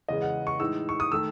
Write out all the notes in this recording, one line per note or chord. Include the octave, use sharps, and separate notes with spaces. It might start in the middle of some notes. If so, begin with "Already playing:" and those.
E2 C#3 G#3 D#5
F#5
C#6
A2 E3 G#3 D#4 E6
C#6
D#6
D#3 A3 E6